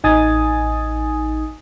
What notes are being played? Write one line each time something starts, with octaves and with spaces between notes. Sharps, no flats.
A1 D#4 G#5 D#6 A6